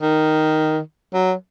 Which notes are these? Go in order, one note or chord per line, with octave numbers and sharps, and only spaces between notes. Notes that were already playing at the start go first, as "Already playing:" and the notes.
D#3
F#3